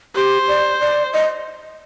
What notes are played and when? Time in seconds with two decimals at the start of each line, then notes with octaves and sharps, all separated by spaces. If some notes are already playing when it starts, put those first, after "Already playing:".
0.15 G4 C5
0.48 D5
0.81 D5
1.13 D#5